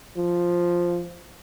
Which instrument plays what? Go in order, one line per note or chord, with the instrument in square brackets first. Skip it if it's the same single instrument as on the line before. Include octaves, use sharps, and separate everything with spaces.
[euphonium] F3